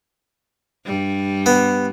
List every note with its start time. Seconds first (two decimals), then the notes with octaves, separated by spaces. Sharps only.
0.86 G2 G3
1.46 B3